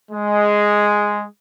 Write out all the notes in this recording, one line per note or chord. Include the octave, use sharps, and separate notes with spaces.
G#3